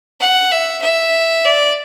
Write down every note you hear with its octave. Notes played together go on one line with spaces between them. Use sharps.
F#5
E5
E5
D5